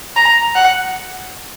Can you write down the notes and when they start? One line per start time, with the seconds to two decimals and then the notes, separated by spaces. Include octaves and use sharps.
0.16 A#5
0.55 F#5